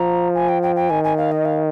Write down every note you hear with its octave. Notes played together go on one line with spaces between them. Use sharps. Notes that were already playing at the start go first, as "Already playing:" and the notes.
Already playing: F3 A#5
G#5
G5
G5
G5
D#3 G#5
G#5
F5
D#5
F5